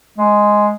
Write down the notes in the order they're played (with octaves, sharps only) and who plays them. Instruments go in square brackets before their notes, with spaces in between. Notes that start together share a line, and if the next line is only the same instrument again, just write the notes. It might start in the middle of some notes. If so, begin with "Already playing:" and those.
[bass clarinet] G#3